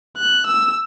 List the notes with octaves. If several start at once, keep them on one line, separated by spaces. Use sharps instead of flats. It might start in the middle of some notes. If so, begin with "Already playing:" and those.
F#6
E6